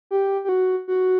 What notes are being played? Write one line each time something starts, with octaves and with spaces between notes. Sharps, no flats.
G4
G4
F#4
F#4